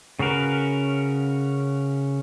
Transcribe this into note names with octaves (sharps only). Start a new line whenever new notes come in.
C#3 C#4 F#4 A#4 B4